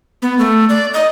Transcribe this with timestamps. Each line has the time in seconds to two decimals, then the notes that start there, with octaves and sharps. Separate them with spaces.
0.22 B3
0.39 A3
0.69 D5
0.94 D#5